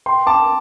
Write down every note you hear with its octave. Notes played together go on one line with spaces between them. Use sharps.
G5 C6
A5 D6